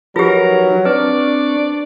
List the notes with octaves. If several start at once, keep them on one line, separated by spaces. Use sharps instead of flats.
F3 F#3 D#4 F4 G4 A#4 B4
C4 D4 B4 D5 C#6